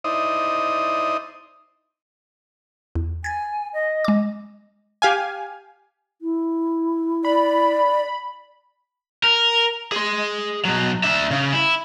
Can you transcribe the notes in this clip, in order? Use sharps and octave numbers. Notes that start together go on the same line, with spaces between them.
D#4 E4 C5 D5 D#5 D#6
E2
G#5 G#6 A6
D#5
G#3 D6
G4 F5 G#5
E4
D5 B5
A#4
G#4 C6
B2 F#3
D4 E5
C#3
E4